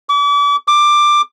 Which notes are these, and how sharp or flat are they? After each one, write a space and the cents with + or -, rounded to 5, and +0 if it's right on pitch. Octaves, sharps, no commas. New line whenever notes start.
D6 -40
D6 +10